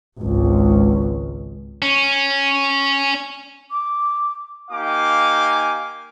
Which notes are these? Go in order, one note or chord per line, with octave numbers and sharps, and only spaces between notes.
G#1 C#2
C#4
D6
A#3 D#4 G4 F5 G#5 D6